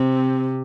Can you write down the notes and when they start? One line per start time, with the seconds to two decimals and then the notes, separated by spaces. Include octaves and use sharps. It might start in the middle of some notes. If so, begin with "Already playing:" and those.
Already playing: C3 C4